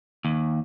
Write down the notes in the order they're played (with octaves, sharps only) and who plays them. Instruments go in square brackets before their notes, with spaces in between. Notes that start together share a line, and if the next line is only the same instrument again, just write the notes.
[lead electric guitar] D#2